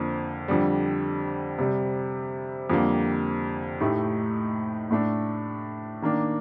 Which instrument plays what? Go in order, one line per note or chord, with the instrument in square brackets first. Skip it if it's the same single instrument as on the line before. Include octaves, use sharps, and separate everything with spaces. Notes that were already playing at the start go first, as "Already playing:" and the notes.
Already playing: [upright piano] F2 D3 F3 A#3
F2 D3 G3
C3 G3 C4
F2 D3 G3 A#3
A2 A3 D#4 G4
A2 A3 D4
D#3 A#3 D4